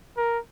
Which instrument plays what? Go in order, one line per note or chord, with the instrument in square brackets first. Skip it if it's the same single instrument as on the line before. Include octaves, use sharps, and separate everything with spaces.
[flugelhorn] A#4